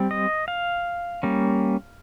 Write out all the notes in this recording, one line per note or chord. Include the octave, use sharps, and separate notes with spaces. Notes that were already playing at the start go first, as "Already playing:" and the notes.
Already playing: G3 C4
D#5
F5
G3 A#3 C#4